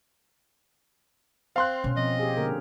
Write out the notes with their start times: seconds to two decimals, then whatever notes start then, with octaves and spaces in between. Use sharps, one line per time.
1.56 C4 F5 C6 F#6
1.84 B2 C#4
1.97 F3 C4 D#5
2.19 G4 G#4
2.37 D3 A#3 A#4